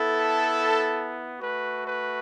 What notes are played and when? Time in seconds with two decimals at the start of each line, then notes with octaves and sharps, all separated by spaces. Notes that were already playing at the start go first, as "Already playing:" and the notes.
Already playing: B3 E4 A4
1.40 A3 F#4 B4
1.87 B4